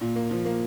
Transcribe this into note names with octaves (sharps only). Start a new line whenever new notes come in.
A#2
A#3
F3
A#3